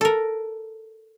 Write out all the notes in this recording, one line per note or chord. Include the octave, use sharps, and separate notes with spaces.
A4 A#4